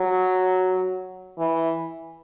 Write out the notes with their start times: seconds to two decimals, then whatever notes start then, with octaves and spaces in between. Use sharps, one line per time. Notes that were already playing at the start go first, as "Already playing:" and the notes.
Already playing: F#3
1.39 E3